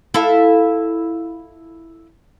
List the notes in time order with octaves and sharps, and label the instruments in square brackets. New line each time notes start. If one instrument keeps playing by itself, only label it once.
[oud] E4 F4 A4